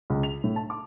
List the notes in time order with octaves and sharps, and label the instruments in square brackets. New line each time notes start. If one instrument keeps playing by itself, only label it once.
[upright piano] C#2
F7
A2
A5
D6